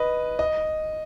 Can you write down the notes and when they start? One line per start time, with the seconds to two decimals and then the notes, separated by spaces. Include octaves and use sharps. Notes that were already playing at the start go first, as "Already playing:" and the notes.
Already playing: B4 D#5
0.39 D#5